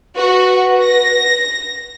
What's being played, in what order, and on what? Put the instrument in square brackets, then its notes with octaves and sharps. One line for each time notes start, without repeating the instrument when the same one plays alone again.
[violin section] F#4 [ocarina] B4
[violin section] A#6